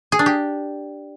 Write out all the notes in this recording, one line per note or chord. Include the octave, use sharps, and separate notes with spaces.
G#4
D4
G4